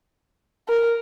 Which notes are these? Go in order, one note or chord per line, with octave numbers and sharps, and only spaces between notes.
A#4